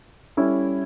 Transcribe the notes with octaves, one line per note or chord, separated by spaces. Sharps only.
G3 C#4 E4 A4